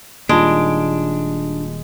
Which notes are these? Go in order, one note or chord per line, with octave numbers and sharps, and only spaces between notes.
D#1 D#2 G#3 D4 F4 A5 D7